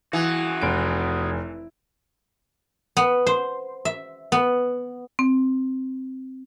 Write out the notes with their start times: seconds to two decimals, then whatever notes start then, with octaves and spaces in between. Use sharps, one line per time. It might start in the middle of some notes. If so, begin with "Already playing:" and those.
0.13 E3 F#4 G#4
0.62 F1 D7
2.97 B3
3.26 C5
3.85 E5
4.32 B3
5.19 C4